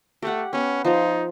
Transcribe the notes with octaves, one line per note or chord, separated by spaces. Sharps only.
A3 G4 F#5
B3 C#4
F3 D#4